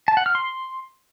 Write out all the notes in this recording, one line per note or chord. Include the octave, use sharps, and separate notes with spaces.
A5
F#5
F6
C6